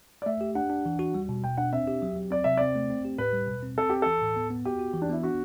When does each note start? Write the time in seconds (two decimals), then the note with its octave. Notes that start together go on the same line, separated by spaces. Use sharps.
0.22 D5
0.26 A3 E5
0.41 G4
0.55 D4 F#5
0.70 D4
0.86 E3
0.99 F#4
1.14 G3
1.29 B2
1.44 B2 G5
1.57 D4 F#5
1.73 C4 E5
1.88 G4
2.02 F#3
2.16 F#3
2.31 C4 D5
2.44 C3 E5
2.57 C4 D5
2.76 A3
2.90 C4
3.05 G4
3.18 A2 B4
3.33 G3
3.47 B2
3.63 C4
3.78 C4 A4
3.90 C4 G4
4.02 E3 A4
4.22 A2
4.36 B3
4.50 B3
4.65 F#4 G4
4.79 F#4
4.94 E3
5.02 D4
5.09 B3 E4
5.23 D4 F#4